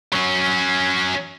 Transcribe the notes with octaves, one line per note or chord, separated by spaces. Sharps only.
F#3 C#4